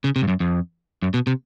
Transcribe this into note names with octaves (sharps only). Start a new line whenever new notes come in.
C#3
C3
G2
F#2
F2
F#2
B2
C3